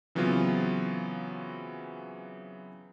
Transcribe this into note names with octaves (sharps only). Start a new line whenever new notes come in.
C#3 E3 F#3 B3 C4 F4